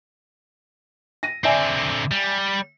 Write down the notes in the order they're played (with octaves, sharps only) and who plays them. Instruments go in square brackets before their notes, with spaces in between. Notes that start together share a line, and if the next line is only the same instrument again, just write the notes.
[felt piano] A#6 D#7
[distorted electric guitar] D3 C4 [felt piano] D5 E5 G#5
[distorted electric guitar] G3